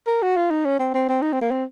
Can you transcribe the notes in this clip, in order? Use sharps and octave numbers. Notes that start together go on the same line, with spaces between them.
A#4
F#4
F4
D#4
C#4
C4
C4
C4
D#4
C4
A#3
C4